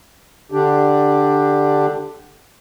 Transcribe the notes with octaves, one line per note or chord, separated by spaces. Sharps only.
D3 D4 G4